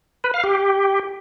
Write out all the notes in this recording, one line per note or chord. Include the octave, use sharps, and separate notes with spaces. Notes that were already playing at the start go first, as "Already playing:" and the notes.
B4
F5
G4